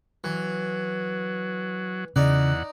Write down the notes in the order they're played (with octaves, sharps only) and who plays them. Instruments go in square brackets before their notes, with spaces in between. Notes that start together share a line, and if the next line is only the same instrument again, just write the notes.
[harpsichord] E3 [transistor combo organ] F#3
[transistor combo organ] E2 F#5 [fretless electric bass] C#3 [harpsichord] D#4 D5